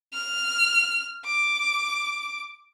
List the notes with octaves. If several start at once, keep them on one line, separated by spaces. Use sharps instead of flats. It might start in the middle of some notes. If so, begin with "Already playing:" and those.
F6
D6